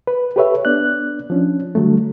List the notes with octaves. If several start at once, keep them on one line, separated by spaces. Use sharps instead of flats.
B4
G4 A4 B4 C#5 E5
B3 D4 D5 F#6
F3 C#4 D4
D3 F#3 G3 A3